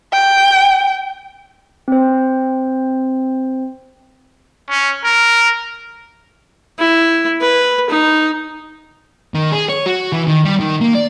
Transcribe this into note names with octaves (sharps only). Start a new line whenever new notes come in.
G5
C4 C5
C#4
A#4
E4
B4
D#4
D#3
G#4
C#5
F#4
E3
D#3
G3
D#3
A#3
D5